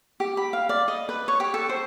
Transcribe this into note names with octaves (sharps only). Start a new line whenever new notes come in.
G4
B5
F5
D5
D#5
B4
C#5
G4
A4
C5